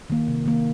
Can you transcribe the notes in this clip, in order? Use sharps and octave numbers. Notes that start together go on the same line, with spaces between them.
D#3 A#3
C3
D#3 A#3